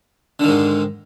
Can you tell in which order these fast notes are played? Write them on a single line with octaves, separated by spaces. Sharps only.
D3 D#3 G#2